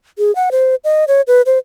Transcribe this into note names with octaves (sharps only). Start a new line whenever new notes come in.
G#4
F#5
C5
D#5
C#5
B4
C5